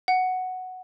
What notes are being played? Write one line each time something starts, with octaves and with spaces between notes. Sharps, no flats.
F#5